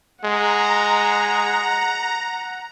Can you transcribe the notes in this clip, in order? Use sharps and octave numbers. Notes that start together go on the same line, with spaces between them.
G#3 F#5 A#5